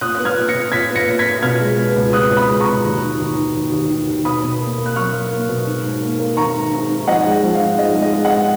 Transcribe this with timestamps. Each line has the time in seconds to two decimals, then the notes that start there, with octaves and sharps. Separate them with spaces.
0.01 A#2 D#6 F#6
0.15 B3 F#6
0.25 F6 G#6
0.37 A#2
0.48 A#6 C#7
0.54 A#2
0.72 A#2 G#6 B6
0.90 B3
0.96 A#6 C#7
1.08 A#2
1.19 G#6 B6
1.25 A#2
1.43 B2 F6 G#6
1.61 G#3
1.78 B3
1.96 C#2
2.13 B3 D#6 F#6
2.31 C#2
2.37 B5 D#6
2.49 G#3
2.60 A#5 C#6
2.67 B2
2.84 D#2
3.02 D#3
3.20 D#2
3.37 D#3
3.55 D#2
3.72 D#2
3.90 D#3
4.07 D#2
4.25 B2 B5 D#6
4.43 B2
4.60 A#3
4.78 A#3
4.86 F#6
4.96 F#3 C#6 F6
5.13 A#3
5.31 A#3
5.49 B2
5.67 G#2
5.84 G#2
6.02 A#3
6.20 A#3
6.37 D#3 A#5 C#6
6.55 G#2
6.72 G#2
6.89 G#2
7.07 F3 D#5 F#5
7.26 G#3
7.43 F3
7.55 F5
7.61 G#2
7.78 G#3 D#5
7.96 G#3
8.02 D#5
8.13 G#3
8.25 D#5 F#5